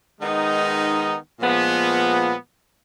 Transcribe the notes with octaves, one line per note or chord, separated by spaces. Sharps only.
D#3 G#3 B3 D#4
A#2 F3 G#3 B3